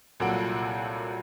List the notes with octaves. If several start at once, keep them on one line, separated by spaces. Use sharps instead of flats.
C2 A#2 F#3 A4 F#5 D7